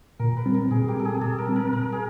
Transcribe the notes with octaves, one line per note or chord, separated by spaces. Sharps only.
A#2 A#4
B4
G3 C4
A#4
A#2 G#4
G4
G3 C4 A4
G#4
A#2 A4
A#4
G3 C4
A#4
A#2 A#4
G#4